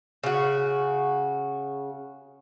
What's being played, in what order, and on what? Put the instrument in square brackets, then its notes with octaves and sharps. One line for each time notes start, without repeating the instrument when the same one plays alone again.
[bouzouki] C#3 F#4